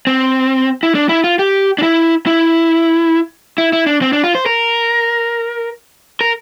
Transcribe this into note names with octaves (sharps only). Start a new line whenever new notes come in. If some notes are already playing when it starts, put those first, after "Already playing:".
C4
E4
D4
E4
F4
G4
D4
E4
E4
E4
E4
D4
C4
D4
F4
C5
A#4
A#4